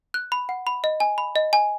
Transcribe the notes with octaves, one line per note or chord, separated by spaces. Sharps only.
F#6
B5
F#5
B5
D#5
G#5
B5
D#5
G#5